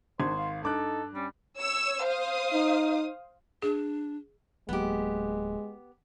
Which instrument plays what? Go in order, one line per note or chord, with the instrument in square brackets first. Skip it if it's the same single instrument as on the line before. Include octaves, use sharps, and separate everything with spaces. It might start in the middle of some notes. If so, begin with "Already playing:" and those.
[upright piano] G#1 G#6 [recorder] D4 [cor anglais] C5
[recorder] F5
[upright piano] G2 D6 F#6 [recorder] D#4 [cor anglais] A4
[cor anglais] G3 [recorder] C#4
[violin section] C#5 E6
C5 F5 D#6
[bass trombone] D#4
[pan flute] D4 [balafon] G#4
[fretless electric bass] D1 F#3 A#3 [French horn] G#3 [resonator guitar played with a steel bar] B3 G4